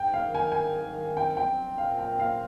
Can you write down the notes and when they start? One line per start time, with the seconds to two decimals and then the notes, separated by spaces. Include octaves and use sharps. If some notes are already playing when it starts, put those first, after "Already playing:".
Already playing: G#2 G5
0.14 F5
0.24 D#3
0.35 G#5
0.52 G#2 G#5
0.86 D#3
1.16 C4 G5
1.37 G5
1.48 C4
1.78 A#2 F5
1.99 G5
2.09 C4
2.20 F5